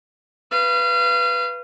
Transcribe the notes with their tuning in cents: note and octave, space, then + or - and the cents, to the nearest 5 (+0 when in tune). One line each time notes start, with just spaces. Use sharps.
B4 +0 F5 -30